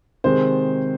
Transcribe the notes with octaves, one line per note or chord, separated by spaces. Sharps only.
C3 D#3 G#3 C5